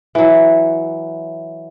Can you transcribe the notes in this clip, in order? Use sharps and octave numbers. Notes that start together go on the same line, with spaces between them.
E3 F#3